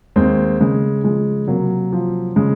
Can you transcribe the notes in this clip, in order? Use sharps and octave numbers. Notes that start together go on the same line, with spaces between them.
D#2 G#3 C4
C#3 G#3
F3 G#3
C3 F#3 A#3
F3
C#3 G#3